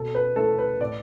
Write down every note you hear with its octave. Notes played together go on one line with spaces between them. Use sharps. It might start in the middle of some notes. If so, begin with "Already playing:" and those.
Already playing: B2 A4
B4
A3 E4 A4
B4
A2 D5